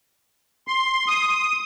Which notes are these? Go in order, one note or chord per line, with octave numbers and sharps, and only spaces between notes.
C6
D#6